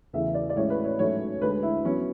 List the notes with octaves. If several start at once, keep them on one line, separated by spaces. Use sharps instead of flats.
E2 C#3 E3 A3 E5
D5
D5
A2 E3 G#3 C#4 C#5
B4
C#5
G#2 F#3 A3 C#4 C#5
D2 D3 G#3 B4
E4
F#3 B3 C#4